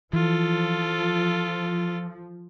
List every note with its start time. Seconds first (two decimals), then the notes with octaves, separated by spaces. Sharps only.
0.13 E3 F3 F4 A4